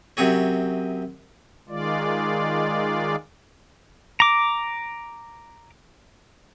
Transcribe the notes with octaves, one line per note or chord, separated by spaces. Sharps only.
F#2 C3 G#4 C#5
D#3 G#3 F4 D5
A#5 D6